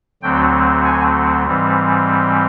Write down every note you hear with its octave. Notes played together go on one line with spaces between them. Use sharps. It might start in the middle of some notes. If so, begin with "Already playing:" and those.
D2 D3 F#3 A3 C4 G5
G#5
G#2 E3 G3 C4